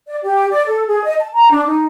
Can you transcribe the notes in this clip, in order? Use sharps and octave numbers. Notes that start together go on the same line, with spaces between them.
D5
G4
D5
A4
G#4
D#5
A5
A#5
D4
D#4